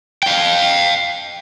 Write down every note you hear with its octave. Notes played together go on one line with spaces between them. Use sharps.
F5 G5